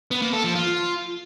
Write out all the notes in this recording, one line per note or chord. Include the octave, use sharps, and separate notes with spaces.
B3
A#3
A4
F3
F4